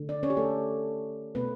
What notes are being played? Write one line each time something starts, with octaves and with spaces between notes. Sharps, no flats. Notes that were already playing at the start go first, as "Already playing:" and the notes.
Already playing: D3 A3
D4 D5
C#4 C#5
G4
A3 A4
B2 A3 B3 B4